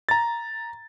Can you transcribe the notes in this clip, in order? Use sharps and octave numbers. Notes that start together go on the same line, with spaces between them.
A#5 A6